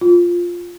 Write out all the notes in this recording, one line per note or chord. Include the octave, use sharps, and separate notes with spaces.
F4